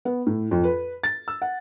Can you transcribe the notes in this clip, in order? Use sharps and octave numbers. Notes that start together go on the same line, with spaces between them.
B3
A2
F2
B4
A6
E6
F#5